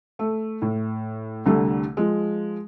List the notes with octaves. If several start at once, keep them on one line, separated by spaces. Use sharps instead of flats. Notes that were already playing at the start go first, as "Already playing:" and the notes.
A3
A2
C2 D3 G3 A3
F3 G#3